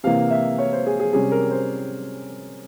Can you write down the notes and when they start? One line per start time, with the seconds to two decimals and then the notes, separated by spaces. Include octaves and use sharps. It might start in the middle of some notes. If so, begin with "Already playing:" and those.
0.04 C3 E3 A#3 F5
0.31 E5
0.58 C#5
0.73 C5
0.86 G#4
1.00 G#4
1.13 C3 G3 C#4 G#4
1.32 A#4
1.51 C5